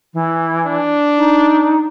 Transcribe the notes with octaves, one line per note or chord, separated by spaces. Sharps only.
E3
D4
D#4